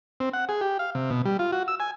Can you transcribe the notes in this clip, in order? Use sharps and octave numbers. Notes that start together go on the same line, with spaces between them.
C4
F#5
G#4
G4
F5
C3
B2
G3
F4
F#4
E6
G#5